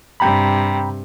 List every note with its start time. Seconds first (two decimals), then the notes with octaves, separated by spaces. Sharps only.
0.20 G2 C3 G5 A#5 B5